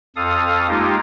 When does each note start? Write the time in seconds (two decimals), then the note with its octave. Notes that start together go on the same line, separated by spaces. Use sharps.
0.16 F2 A4 F5 D#6
0.68 G#3 A#3 D#4 F4 G4